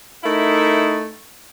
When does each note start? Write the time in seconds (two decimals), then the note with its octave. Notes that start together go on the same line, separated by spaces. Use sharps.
0.24 A3 D#4 E4 A#4 E5